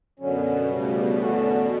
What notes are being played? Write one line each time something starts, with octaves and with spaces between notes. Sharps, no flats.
F#2 B2 D3 F#3 C#4
D2 G2 C#3 G3
E2 B2 D3 A3 C#4 F#4